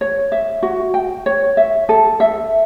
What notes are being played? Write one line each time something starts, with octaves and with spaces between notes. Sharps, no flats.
C#5
E5
F#4
G5
C#5
E5
A4
E5